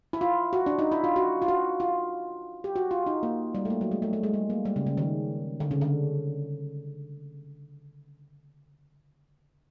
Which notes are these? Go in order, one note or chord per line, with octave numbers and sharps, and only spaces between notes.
E4
F4
F#4
D4
D#4
E4
F4
F#4
F4
F#4
F4
G4
F#4
F4
D#4
A#3
G3
A3
A#3
F#3
G#3
A3
A3
G#3
G3
A#3
G3
C#3
C#3
D#3
D3
C#3
D3